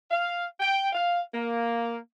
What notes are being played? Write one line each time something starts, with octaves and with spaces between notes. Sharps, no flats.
F5
G5
F5
A#3